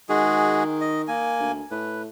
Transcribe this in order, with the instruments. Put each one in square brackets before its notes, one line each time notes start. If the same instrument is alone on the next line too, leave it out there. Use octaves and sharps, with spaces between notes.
[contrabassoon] D#3 [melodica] G#3 F#4 G#4
[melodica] D#5
A#3 G#5
[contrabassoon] D2
[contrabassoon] A2 [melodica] B4